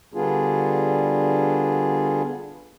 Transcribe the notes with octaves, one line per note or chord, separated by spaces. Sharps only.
D3 G3 B3 D4 F4 G#4